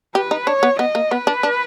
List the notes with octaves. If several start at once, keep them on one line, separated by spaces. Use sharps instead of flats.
G4 B4
D#4
D4 C#5
B3
B3 D#5
A#3
B3 B4
D4
D4